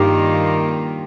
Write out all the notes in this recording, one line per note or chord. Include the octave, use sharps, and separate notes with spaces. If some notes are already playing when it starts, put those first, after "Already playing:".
Already playing: G2 D#3 A#3 F4 G4